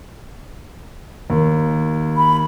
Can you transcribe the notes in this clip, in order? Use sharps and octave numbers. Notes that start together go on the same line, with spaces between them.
D#2
B5